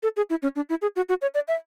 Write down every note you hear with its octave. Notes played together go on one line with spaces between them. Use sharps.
A4
G#4
E4
C#4
D4
E4
G#4
F#4
F#4
C#5
D5
E5